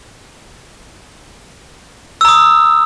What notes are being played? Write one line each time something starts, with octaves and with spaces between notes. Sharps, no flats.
A#5 D#6 E6